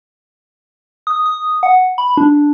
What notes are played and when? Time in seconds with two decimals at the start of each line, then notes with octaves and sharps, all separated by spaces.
1.07 D#6
1.26 D#6
1.63 F#5
1.98 B5
2.17 D4